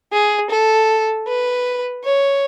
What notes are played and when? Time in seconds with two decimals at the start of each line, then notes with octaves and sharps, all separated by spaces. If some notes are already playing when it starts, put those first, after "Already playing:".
0.12 G#4
0.50 A4
1.27 B4
2.04 C#5